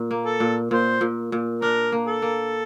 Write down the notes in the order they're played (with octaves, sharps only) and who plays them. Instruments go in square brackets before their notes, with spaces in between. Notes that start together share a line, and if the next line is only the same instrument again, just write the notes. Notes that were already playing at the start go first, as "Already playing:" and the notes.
Already playing: [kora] A#2
A#3
[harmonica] A4
[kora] A#2
[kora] A#2 [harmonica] C5
[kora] A#2
A#2
[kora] D4 [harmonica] A#4
[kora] A#3
[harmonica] A4
[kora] A#3